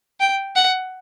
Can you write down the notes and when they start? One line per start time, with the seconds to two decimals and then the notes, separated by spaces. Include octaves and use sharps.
0.20 G5
0.56 F#5